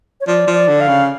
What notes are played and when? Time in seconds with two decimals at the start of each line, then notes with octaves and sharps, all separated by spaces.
0.21 C#5
0.27 F3 D5
0.47 F3
0.54 D5
0.68 D3
0.81 F5
0.88 C#3